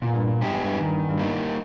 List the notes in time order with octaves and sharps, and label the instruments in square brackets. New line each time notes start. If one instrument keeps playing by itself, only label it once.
[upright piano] E2 [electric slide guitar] A#2
[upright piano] G2
E2
[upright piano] G2 [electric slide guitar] G#3 B3 G4
[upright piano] E2
G2
E2
[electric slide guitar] D#3
[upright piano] G2
E2
G2
[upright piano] E2 [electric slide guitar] G3 A#3 D#4